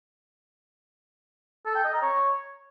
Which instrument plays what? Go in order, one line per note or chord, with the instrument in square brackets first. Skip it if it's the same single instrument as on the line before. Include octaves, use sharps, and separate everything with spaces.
[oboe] A4
G5
D#5
A#5
C#5